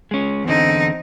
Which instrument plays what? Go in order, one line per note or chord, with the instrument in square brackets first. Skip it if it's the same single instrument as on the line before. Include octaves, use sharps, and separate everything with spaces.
[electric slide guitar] G#3 C#4
[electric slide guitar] E2 D3 [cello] C4 D#4